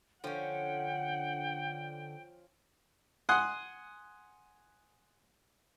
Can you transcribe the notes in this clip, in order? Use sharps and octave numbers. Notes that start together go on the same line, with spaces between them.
D3 F3 C#4 F#5 G5
F#5 G#5 C6 D#6 F#6